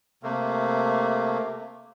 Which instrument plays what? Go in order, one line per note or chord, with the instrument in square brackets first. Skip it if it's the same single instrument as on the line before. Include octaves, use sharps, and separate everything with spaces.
[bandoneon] C3 A3 A#3